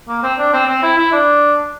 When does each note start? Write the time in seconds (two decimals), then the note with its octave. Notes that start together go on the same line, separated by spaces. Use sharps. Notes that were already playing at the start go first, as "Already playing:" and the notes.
0.08 A#3
0.23 C4
0.39 D4
0.54 C4
0.68 C4
0.83 E4
0.97 E4
1.12 D4